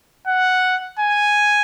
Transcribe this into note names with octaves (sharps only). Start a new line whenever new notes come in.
F#5
G#5